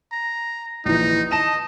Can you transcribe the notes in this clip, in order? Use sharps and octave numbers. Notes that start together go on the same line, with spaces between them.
A#5
A#1 E3 D#4
D#5 A5 E7